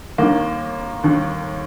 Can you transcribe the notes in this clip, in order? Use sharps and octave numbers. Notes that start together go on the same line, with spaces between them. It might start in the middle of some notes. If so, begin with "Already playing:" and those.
D#2 D#3 A#3
D#2 D#3